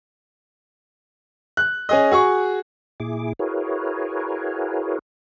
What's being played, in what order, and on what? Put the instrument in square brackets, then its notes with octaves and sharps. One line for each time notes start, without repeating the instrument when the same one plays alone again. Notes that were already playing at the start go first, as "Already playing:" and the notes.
[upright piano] F#6
C#4 G#4 D#5
F#4 G#4 C#6
[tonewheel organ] A#2 E4 G#4 D6
E4 F#4 G#4 A#4 B4 C#5